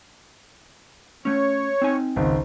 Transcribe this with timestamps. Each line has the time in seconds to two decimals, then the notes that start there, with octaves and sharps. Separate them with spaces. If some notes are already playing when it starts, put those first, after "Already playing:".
1.25 A3 C#4 C#5
1.82 C4 D#4 G#5
2.16 G#1 C#2